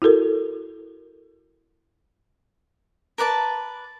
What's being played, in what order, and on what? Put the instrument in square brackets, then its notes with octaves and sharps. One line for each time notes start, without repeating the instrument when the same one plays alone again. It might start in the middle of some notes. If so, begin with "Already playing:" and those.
[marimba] E4 F#4 A4 A#4
[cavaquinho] A#4 B4 D5 A5